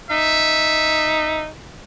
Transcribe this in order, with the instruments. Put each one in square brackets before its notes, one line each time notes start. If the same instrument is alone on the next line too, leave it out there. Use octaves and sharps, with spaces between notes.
[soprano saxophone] D#4 [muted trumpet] E5